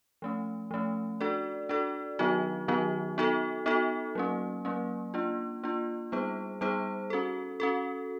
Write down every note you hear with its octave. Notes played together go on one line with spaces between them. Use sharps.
F3 A3 C#4
F3 A3 C#4
D4 F#4 A4 D5
D4 F#4 A4 D5
D#3 F#3 B3 D#4 F#4
D#3 F#3 B3 D#4 F#4
B3 D#4 F#4 A4
B3 D#4 F#4 A4
F#3 A#3 C#4
F#3 A#3 C#4
A#3 D4 F4
A#3 D4 F4
G3 B3 D#4 G#4 C5
G3 B3 D#4 G#4 C5
C#4 F#4 A4
C#4 F#4 A4